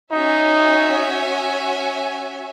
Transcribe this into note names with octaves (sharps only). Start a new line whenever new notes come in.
C#4 D#4 F#4 C#5 E5 G#5